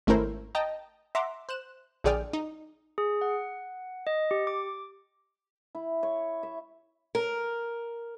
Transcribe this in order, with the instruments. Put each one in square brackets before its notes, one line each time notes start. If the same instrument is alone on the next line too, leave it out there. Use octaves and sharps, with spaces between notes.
[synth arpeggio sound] G#1 A3 C#4 E4 A#4 C5
D#5 G5 A5 A#5
E5 F#5 A#5 C6 D6
C5 F#6 E7
A#1 D3 G#4 D5 G5 F6
D#4
[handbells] G#4
F#5
D#5
G4
D6
[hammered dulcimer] E4
C#5
E5
[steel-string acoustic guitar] A#4